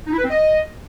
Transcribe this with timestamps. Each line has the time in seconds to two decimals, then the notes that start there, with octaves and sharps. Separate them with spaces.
0.07 D#4
0.13 E4
0.19 B4
0.24 C4
0.30 D#5